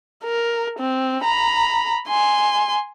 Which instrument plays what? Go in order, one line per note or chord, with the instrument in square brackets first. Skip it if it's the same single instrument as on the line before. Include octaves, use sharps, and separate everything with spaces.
[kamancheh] A#4
C4
A#5 B5
G#5 C6